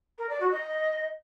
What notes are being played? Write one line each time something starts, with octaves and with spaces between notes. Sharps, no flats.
A#4
D5
F#4
D#5